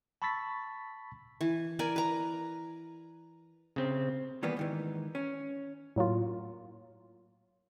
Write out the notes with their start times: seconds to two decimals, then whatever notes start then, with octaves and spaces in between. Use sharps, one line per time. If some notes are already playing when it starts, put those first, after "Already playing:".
0.22 A5 B5 C#6 E6 A6 B6
1.41 E3
1.79 A#4 D5 G#5
1.96 B4 A#5
3.76 C#3 C4
4.43 D#3 E3 G3 A#3 B3
4.57 G#2 D#3 E3
5.15 C#4
5.96 A2 F#3 A#3 F4